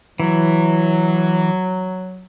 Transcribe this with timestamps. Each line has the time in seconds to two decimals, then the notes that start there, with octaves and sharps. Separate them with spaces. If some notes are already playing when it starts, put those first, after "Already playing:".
0.20 E3 F#3